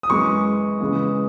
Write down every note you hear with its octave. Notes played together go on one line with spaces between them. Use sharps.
D#6
F#2 E3 G#3 C#6
C#3 E3 G#3